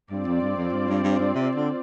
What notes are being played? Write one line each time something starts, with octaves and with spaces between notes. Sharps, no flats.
G2 C4 F4 D5
F2
G2
F2
G2
G2
G2
G2
C3
D3